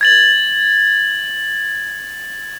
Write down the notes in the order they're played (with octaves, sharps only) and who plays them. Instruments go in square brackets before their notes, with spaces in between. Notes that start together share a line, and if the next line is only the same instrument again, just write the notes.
[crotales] G#6 A6 F#7